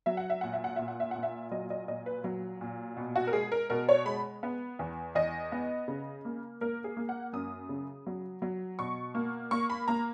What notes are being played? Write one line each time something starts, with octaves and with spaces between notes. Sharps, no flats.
F#3 E5
F#5
E5
A#2 F#5
E5
F#5
A#2 E5
F#5
E5
A#2 F#5
E5
F#3 D#5
D#5
A#2 D#5
B4
F#3
A#2
B2
F#4
A#4
G#3 G#4
A#4
B2 A#4
C#5
G#3 B5
B3
E2
E2 D#5
B3
C#3
A#3
A#3 A#4
G#4
A#3
F#5
F#2 D#6
C#3
F#3
F#3
B2 C#6
A#3
A#3 C#6
B5
A#3 A#5